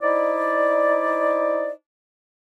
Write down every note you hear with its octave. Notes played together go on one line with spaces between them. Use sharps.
D#4 E4 C5 D5